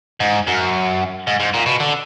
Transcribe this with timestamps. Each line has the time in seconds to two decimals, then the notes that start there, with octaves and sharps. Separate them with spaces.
0.20 G#2
0.47 F#2
1.27 G#2
1.40 G#2
1.54 A#2
1.66 B2
1.80 D3